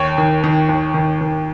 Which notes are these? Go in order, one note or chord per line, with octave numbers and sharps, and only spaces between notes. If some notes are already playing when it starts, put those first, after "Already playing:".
Already playing: D#2 C#5
D#3
D#3
D#2
D#3
D#3